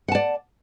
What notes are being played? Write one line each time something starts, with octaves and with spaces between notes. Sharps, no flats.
D5 F#5 A5